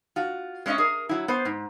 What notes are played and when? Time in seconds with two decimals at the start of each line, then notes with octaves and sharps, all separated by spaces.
0.16 F4 F#4
0.66 G#3 C#4 C#5 D#5 E5
0.78 G#4 A#4
1.09 F#3 E4
1.28 B3 C5
1.45 G#2